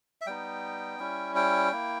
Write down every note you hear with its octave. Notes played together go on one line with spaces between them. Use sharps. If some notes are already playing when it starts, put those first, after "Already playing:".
E5
G3 B3 D#4 G5
G3 C#4 E4
G5
A#3 E4